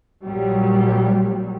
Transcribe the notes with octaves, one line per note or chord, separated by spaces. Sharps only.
A#1 A#2 F#3 G3